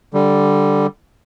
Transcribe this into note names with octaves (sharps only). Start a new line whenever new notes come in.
D3 G3